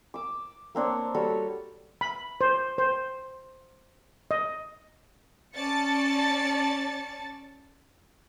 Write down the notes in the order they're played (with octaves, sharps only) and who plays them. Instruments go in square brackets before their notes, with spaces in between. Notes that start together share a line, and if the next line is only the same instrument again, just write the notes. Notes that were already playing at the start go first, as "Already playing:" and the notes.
[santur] D6 E6
A#3 C4 D4 C#5
G3 F#4 A4 C#5
[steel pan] B5
C5
C5
D#5
[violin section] C#4 D5 A5 A6 C#7